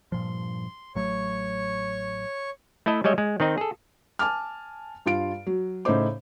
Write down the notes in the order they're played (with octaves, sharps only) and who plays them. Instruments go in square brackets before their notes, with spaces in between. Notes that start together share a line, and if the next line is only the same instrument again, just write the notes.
[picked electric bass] G2 A#2 F3 [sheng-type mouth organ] C6
[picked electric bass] A1 F#3 A3 [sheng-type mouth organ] C#5 C#6
[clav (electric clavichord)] A3 E4 A4 D#5
G3 G#3 C#5 D#5 E5
G#3
D#3 C4 D#4 D#5
G#4 A4
[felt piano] G#5 A5 D6 F6
G2 F4 F5 D7
F#3
A2 C#3 D#4 C5 D6